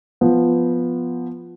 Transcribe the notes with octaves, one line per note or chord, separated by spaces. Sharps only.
F3 B3